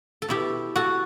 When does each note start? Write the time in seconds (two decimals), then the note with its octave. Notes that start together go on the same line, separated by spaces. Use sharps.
0.22 A4
0.28 B2 E4 G4
0.76 F#4 A4